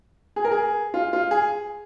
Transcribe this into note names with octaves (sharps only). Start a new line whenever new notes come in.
G#4
A#4
G#4
F4
F4
G#4